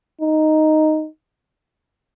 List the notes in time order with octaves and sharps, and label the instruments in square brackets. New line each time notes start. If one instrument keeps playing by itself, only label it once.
[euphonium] D#4